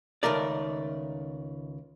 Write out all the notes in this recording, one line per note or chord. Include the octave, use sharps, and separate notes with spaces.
C#2 D#3 A3 A#4 D5